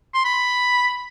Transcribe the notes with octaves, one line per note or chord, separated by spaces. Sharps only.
C6
B5